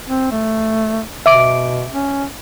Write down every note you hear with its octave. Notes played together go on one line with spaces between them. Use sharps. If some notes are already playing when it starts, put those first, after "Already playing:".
C4
A3
B2 E5 D6 D7
C#4